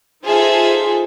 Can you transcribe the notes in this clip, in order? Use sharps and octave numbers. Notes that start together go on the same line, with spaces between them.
D#4 F4 G#4 A4 C5 E5